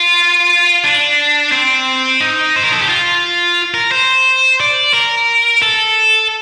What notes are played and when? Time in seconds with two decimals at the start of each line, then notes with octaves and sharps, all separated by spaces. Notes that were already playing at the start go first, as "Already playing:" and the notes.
Already playing: F4
0.84 D4
1.52 C4
2.21 D#4
2.56 C5
2.64 A#4
2.73 A4
2.81 G4
2.89 F4
3.74 A#4
3.91 C5
4.60 D5
4.94 A#4
5.62 A4